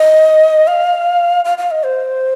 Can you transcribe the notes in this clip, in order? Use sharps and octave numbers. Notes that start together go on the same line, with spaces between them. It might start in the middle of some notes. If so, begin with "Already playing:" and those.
Already playing: D#5
F5
F5
F5
D#5
C5